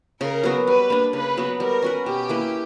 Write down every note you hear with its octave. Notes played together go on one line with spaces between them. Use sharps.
C#3 A#4
F#3 B3 F#4
G3 B4
A#3 D4
C#3 B4
F#3 B3 F#4
G3 A#4
C#4 F#4 B4
B2 G4
A#3 E4 B4